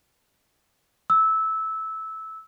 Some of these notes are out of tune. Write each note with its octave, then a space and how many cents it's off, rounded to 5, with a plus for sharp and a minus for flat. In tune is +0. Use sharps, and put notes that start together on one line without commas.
E6 -15